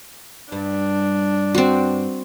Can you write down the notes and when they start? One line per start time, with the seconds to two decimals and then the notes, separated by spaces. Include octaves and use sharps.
0.52 G2 D4
1.55 C4 F#4